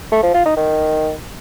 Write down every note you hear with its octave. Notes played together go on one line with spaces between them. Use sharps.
A3
F3
F4
D#4
D#3